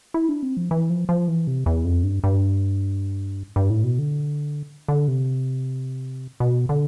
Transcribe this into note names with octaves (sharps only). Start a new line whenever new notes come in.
E4
D4
C4
F3
E3
F3
F3
E3
C3
E2
F2
G2
G2
G2
A2
B2
D3
D3
C3
B2
D3